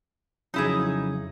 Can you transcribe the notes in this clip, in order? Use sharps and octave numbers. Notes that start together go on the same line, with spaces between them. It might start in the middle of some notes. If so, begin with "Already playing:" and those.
F2 C#3 F#3 D#4 E4 G#4